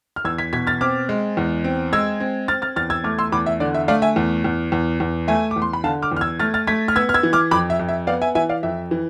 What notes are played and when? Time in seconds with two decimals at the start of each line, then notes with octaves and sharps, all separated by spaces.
0.16 F6
0.25 E2 E6 G#6
0.38 G#6 B6
0.53 B2 G#6 B6
0.67 F6 A6
0.81 C4 D6 F6
1.09 G#3
1.37 E2
1.64 C4
1.93 G#3 E6 G#6
2.20 C4
2.48 C4 F6 A6
2.62 F6 A6
2.76 E2 F6 A6
2.90 E6 G#6
3.04 A3 D6 F6
3.19 C6 E6
3.32 E2 B5 D6
3.46 E5
3.60 D3 D5
3.74 E5
3.88 A3 D5 F5
4.02 E5 G#5
4.16 E2
4.44 E2
4.72 E2
5.00 E2
5.28 A3 E5 G#5
5.51 D6
5.56 E2
5.62 C6
5.73 B5
5.84 D3 F5 A5
6.02 D6 F6
6.12 E2
6.17 F6
6.21 E6 G#6
6.39 A3 F6 A6
6.54 F6 A6
6.67 A3 G#6 B6
6.88 F6
6.96 B3 E6 G#6
7.09 F6
7.14 E6 G#6
7.23 E3
7.33 D6 F6
7.51 F2 B5 D6
7.70 E5
7.79 F2
7.89 E5
8.07 B3 D5 F5
8.22 E5 G#5
8.35 E3 E5 G#5
8.49 D5 F5
8.63 F2 E5
8.91 E3